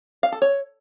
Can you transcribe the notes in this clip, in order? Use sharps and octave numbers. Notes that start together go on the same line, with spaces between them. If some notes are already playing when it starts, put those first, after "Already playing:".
F5
A4
C#5